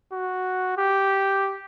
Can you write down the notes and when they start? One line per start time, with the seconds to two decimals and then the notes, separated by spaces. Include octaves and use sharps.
0.13 F#4
0.77 G4